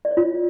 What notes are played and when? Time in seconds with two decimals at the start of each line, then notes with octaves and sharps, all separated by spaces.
0.05 D5
0.11 C#5
0.17 F4